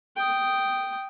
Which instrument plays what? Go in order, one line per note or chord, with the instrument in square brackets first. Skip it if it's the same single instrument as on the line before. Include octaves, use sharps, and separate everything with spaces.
[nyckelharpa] G5 D#6